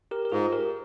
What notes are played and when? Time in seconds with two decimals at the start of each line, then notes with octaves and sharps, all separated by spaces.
0.11 G4 A#4
0.25 A#4
0.32 G#2 F4 G#4
0.52 G4 A#4